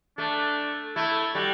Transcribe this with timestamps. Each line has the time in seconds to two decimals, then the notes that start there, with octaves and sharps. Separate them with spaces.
0.18 A3 D4
0.96 A3 E4
1.35 G3 F#4